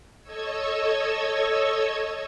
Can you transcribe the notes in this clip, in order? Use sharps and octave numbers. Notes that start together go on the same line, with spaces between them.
A4 C#5 D#5 C#6 E6 G#6